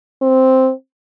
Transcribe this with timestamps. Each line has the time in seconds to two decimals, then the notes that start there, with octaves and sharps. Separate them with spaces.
0.22 C4